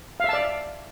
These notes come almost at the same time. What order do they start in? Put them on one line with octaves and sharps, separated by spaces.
F5 E5 A5 D5